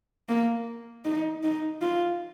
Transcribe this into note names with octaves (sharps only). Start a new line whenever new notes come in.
A#3
D#4
D#4
F4